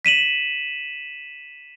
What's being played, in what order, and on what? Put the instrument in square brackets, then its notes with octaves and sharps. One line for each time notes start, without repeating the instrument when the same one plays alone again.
[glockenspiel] B6 D#7 E7 F#7